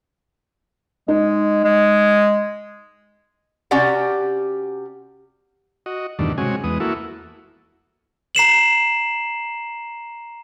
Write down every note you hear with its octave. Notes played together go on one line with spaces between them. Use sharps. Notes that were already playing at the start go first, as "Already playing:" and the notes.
G#3 D#4
G#3
C3 C#4 F#4 G4 D5 F#5
F#4 D#5
E2 G2 B2 D#3 A3 D4
C3 G#3 C#4 F#4 G#5
E2 G#3 B3 D#6
A#3 E4 F#4 A4
A#5 C7 E7 F#7